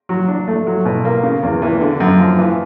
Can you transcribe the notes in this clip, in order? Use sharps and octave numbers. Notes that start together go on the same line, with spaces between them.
F#3
D4
A3
F#3
B2
A#3
C#3
E2
E3
D3
F#2
F3
E3